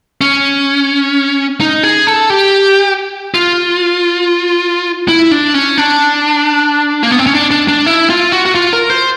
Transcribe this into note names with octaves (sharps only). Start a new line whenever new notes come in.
C#4
D#4
G#4
A4
G4
F4
E4
D4
C#4
D4
A#3
B3
C4
C#4
D4
D4
D4
E4
F4
F#4
F#4
F4
A#4
C5